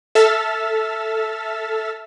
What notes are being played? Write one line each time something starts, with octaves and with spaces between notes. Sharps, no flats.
A4 E5 E6 F6 A6 B6